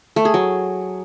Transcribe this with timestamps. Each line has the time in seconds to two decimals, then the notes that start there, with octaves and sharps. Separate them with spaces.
0.16 A3
0.25 G#4
0.34 F#3